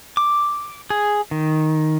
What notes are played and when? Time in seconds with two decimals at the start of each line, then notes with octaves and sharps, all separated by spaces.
0.17 D6
0.90 G#4
1.31 D#3